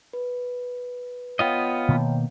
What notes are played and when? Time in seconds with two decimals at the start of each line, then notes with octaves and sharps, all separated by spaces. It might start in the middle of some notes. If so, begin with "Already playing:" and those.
0.13 B4
1.39 B3 F4 C#5 D#5 F5 G5
1.89 B2 D#3 A#3